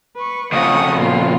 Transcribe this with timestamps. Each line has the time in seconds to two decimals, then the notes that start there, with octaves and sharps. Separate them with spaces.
0.16 B4 C#6
0.52 F2 C#3 F#5 C#6 D#6
0.97 A#2 B3 F4